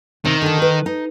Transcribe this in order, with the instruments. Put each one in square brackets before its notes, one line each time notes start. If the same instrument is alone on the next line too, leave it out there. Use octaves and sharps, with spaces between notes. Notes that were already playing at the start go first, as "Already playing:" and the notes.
[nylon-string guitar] C3 [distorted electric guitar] D#3
[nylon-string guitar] D3 A5
A#4 B4
D#4